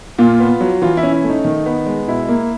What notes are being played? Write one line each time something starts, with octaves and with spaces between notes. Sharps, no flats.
A#2 F4
B3
F#3
E3 F4
E4
C#4
E4
A3
D#4
D#3
B3
G#3
B2 E4
A#3